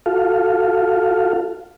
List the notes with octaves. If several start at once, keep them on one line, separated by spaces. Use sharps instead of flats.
F4 F#4 A4 F5